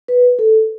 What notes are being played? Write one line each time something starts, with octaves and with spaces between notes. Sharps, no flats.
B4
A4